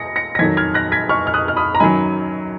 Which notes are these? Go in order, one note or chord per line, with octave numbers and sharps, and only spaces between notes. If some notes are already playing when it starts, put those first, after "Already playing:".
Already playing: D#6 A#6 C#7
A#6 C#7
A#6
F2 D#3 F#3 G#6 B6
F6 G#6
F#6 A#6
G#6 B6
C#6 F6
F6
D#6 F#6
F6
B5 D#6
A#5
F#2 D#3 F#3 G#5 B5